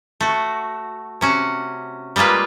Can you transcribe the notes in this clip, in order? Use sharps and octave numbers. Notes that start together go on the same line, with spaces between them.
A3 F#4
C3 C#4 F#4
G3 G#3 A#3 F4 B4